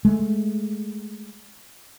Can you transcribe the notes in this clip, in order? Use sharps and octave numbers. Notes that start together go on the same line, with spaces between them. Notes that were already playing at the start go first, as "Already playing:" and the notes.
G#3 A3